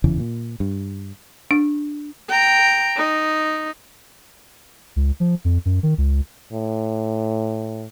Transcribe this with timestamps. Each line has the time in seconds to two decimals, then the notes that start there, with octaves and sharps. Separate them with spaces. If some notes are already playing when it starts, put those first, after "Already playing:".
0.04 F1 E2 C#3 E3
0.19 A#2
0.60 G2
1.51 D4
2.29 G5 A#5
2.97 D#4
4.96 C#2
5.20 F3
5.45 F2
5.65 F#2
5.83 D#3
5.98 C#2
6.53 A2